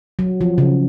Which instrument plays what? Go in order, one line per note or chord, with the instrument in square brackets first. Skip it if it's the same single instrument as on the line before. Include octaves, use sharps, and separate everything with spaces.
[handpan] F#3
F3
C#3